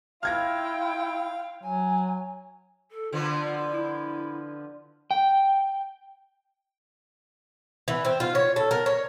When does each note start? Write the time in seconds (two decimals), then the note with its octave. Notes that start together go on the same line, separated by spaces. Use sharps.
0.23 E4 F4 F5 G5 F6 G#6 A#6
1.63 F#3 G#5
2.91 A4
3.13 D3 F3 B3 F4
3.71 E4
5.11 G5
7.88 E3
8.05 C4
8.20 F4
8.35 C#5
8.56 A4
8.71 A#4
8.86 C#5